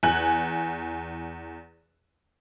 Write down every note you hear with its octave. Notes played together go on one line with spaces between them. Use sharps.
E2 G#5 F#6